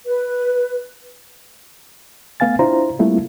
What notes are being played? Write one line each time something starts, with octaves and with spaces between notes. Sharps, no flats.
B4
A3 B3 F5 G#5 A6
D4 E4 F4 C5 A#5
G3 A3 A#3 C4 E4 F4